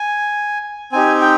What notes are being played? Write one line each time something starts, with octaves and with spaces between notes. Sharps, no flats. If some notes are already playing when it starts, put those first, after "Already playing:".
Already playing: G#5
C4 D#4 G4 G#5
G5